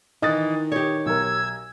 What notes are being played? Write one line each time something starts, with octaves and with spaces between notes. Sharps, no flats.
D#3 E3 D#5 D#6 A6
G4 C#5
B1 A#4 E6 G#6